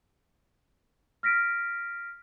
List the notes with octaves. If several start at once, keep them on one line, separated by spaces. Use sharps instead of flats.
F6 A#6 B6 D7